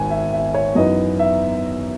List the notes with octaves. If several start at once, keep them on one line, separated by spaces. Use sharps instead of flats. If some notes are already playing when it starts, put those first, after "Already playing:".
Already playing: G#1 G#5
E5
E5
C#5
F#2 E3 B3 D#4 D#5
E5